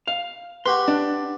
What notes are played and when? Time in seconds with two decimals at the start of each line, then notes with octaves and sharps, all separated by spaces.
0.07 F5
0.66 F#4 G4 B4 C6
0.88 D4